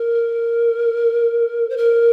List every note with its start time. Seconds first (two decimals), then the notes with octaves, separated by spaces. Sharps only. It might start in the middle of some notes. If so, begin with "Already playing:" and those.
Already playing: A#4
1.70 C5
1.77 A#4